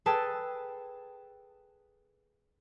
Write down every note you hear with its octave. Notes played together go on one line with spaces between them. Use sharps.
G#4 A4 B4 G5 A5